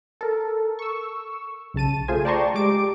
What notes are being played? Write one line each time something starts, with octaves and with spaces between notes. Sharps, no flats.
A4 A#4
C#6 E6
B1 C#3 A5 D#7
A3 F4 G#4 C5 G#5
D5 G5 A5 A#5 C6 C#6
G#3 G4 D6 D7